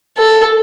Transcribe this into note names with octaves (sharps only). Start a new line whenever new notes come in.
A4